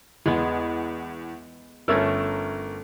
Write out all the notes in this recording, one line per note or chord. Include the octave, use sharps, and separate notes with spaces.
E2 G#3 B3
G1 A3 C#4 A#4 E6